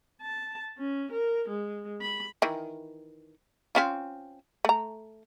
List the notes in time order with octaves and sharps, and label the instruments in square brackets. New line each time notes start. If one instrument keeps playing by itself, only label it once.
[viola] A5
C#4
A#4
G#3
B5
[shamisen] D#3 E3
C4 C#4 F4
A3 A#5